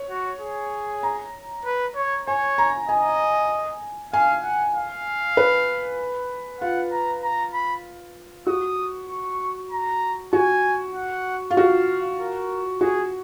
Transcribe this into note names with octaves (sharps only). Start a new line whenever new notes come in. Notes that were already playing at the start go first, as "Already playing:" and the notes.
Already playing: C#5
F#4
G#4
A#5
B4
C#5
C#5 G#5
A#5
D#5 G#5
F5 G#5
F#5
F5
B4
F4 F#5
A#5
A#5
B5
F#4 D#6
C#6
A#5
F#4 G#5
F#5
F4
F#4 F5
A#4
F#4 G#4